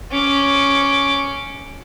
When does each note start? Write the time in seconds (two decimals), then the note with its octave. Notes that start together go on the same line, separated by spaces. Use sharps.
0.12 C#4 D6